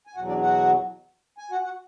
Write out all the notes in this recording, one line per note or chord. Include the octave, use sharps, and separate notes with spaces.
G#5
E2 B2 F#3 F#4 F#5
D4 D5
F#4 F#5
G#5
F#4 F#5
F#4 F#5